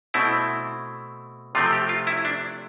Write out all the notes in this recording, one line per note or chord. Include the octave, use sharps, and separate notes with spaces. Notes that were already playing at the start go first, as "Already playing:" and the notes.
B2 A3 C4 E4
C3 F3 A3 C4 F4
G4
F4
E4
D4